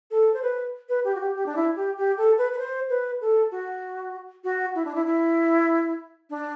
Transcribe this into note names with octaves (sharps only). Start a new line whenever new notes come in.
A4
C5
B4
B4
G4
F#4
G4
G4
D4
E4
G4
G4
A4
B4
B4
C5
B4
A4
F#4
F#4
E4
D4
E4
E4
D4